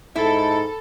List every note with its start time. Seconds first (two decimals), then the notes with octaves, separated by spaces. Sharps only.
0.16 G#2 D#4 E4 A4